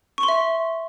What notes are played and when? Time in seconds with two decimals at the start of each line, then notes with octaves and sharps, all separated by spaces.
0.18 C#6
0.23 C6
0.28 E5